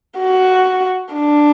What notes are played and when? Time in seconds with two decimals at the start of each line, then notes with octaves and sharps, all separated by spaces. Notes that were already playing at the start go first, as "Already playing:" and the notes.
0.19 F#4
1.14 D4